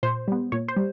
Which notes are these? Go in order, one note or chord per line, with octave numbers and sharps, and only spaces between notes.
A#2 C5
G3 B3
A#2 C#5
C5
G3